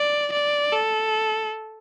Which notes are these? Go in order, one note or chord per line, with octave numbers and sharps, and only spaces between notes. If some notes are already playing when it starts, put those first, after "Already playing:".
Already playing: D5
D5
A4